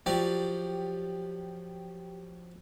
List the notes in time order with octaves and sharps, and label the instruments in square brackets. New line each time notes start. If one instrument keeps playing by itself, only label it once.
[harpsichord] F3 F#3 D5 [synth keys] G4